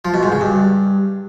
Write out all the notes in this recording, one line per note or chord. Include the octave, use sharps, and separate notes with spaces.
F3
B2
G#2
C#3
G2